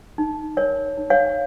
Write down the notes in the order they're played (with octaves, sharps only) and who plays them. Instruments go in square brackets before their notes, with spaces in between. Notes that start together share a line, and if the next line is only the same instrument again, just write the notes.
[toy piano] D#4
A#4 C#5
D#4
C#5 F5